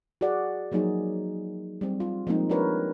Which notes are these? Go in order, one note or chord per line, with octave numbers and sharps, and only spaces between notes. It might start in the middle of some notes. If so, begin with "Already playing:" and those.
F#4 G#4 D5 F#5
F3 F#3 A#3 D#4 G#4
G3 C4
F4
F3 G#3 A#3 C4 D#4
D4 F4 G4 A#4 B4 C#5